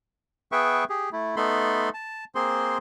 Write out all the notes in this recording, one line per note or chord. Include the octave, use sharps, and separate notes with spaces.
B3 G#4 B4 E5 G5 C#6
G4 G#4
A3 E4
A3 B3 D#4 A4 B5 C6
A5
A#3 C4 G#4 C5 C6